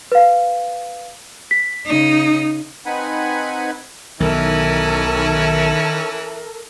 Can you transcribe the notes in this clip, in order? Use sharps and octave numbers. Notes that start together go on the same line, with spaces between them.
B4 F5
B6
C#3 D#4
C4 D#4 B4 F#5 G#5 B5
B1 D#3 E3 C#4 E4 A4 A#4